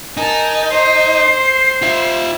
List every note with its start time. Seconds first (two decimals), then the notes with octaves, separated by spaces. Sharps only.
0.17 D#4 A#4 G#5 A5
0.71 C5 C7
1.82 F4 E5